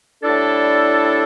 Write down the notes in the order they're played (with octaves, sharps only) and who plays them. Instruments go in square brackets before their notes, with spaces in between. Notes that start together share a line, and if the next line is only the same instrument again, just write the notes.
[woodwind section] A2 G3 E4 A4 [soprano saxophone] D4